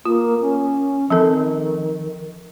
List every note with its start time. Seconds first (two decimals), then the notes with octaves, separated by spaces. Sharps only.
0.05 A#3 F4
0.41 C#4
1.10 D#3 F3 C4 A4